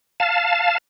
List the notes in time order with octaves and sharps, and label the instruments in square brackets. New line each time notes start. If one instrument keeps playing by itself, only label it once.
[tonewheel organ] F5 A5